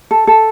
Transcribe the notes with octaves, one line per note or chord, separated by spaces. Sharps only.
A4
A4